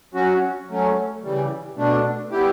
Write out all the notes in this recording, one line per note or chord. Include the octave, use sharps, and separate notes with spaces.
F#3 C#4 F#4
F#3 A3 C#4
C#3 E3 G3
B2 A3 D4
G3 B3 E4 G4